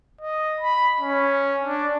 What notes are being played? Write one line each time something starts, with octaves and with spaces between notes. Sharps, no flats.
D#5
B5
C#4
D4